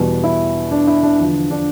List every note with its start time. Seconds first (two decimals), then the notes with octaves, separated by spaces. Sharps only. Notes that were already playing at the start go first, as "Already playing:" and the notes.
Already playing: E2 B2 G3
0.24 E4
0.71 D4
0.87 E4
1.03 D4
1.19 E2 D3 F3
1.51 D4